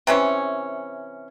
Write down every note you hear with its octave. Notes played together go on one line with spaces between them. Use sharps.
C3 E3 C#4